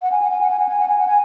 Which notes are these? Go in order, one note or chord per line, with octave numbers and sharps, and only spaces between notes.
F#5
G#5
F#5
G#5
F#5
G#5
F#5
G#5
F#5
G#5
F#5
G#5